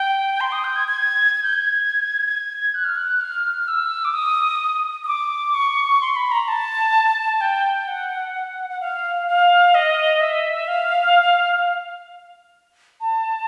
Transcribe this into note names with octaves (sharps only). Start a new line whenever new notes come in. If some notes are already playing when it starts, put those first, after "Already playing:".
Already playing: G5
C6
D#6
G6
G#6
G#6
G#6
G6
G#6
G#6
F#6
F6
F#6
F6
E6
D6
D#6
D#6
D6
C#6
C6
B5
A#5
A5
G5
F#5
F#5
F5
F5
D#5
E5
F5
A5